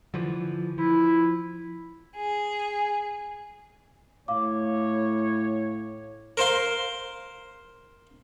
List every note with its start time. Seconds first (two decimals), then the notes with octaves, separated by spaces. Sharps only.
0.14 D3 E3 F3
0.78 F3 E4
2.15 G#4
4.28 A2 C#5 F5 D6
6.37 A#4 C5 F5 C6